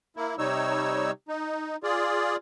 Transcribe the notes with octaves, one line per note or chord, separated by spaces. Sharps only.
A#3 E4
C3 G3 D#4 C#5 E6
D#4
F4 G#4 D5